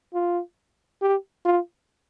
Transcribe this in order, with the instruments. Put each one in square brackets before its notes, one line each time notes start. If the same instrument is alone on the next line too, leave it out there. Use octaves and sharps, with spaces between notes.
[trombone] F4
G4
F4